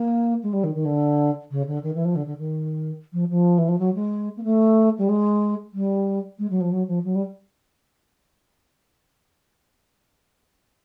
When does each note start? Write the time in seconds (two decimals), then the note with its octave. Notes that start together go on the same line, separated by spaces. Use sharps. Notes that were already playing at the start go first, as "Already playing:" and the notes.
Already playing: A#3
0.43 G#3
0.53 G3
0.64 D#3
0.75 D#3
0.85 D3
1.51 C#3
1.67 D3
1.83 D#3
1.94 E3
2.05 F3
2.15 D3
2.26 D3
2.38 D#3
3.13 F3
3.30 F3
3.58 E3
3.68 F3
3.79 F#3
3.95 G#3
4.37 A#3
4.44 A3
4.98 G3
5.09 G#3
5.73 G3
6.39 G#3
6.50 F#3
6.61 F3
6.72 F#3
6.88 F3
7.04 F#3
7.15 G3